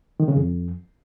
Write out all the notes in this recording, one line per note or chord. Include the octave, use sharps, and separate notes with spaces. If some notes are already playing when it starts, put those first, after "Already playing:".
D#3
C#3
F2